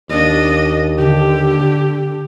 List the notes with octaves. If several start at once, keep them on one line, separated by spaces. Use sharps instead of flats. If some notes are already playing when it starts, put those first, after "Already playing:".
D#2 D4 D#5
D3 G4